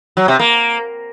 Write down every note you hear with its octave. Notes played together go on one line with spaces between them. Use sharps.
F#3
C3
A#3